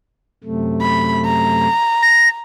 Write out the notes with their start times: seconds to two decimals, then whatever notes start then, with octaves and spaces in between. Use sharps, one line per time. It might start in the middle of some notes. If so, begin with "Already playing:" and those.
0.44 F#2 C3 A3
0.81 B5
1.25 A#5
2.03 A#6